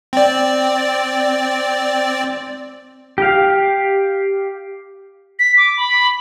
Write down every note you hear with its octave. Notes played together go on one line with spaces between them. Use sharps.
C4 D5
G4 F5
B6
D6
B5